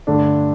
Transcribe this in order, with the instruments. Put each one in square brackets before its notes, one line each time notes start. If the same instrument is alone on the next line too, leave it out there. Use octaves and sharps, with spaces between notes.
[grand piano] G2 D3 A3 D4